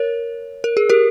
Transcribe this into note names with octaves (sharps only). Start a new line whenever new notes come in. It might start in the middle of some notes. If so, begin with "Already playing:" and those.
Already playing: A#4 C#5
A#4
G#4
G4 A#4